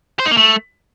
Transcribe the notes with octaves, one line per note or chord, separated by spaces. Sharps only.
C5
D#4
A#3
A3